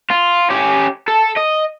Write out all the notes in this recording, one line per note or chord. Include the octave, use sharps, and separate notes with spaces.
F4
C#4 G4
A4
D#5